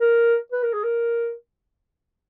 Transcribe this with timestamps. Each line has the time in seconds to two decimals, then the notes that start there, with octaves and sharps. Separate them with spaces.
0.01 A#4
0.52 B4
0.63 A#4
0.74 G#4
0.84 A#4